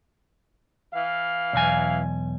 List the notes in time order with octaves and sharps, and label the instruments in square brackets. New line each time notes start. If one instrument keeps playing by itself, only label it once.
[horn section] E3 F5
[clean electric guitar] B1 E2 G#5